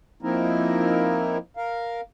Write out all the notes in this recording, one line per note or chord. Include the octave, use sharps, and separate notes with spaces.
F3 A#3 C4 D#4 E4 A#4
A#4 F5